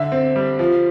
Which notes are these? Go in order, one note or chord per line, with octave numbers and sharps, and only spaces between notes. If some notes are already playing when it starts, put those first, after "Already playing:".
Already playing: D3 E5
C4
G3
F3